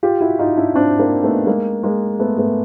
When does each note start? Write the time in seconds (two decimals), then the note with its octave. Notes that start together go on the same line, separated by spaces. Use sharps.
0.03 F4 G4
0.21 E4 F#4
0.39 D#4 F4
0.56 D4 E4
0.75 C4 D4
0.99 A#3 C4
1.23 A3 B3
1.47 G#3 A#3
1.83 G#3 A#3
2.19 A3 B3
2.38 A3 B3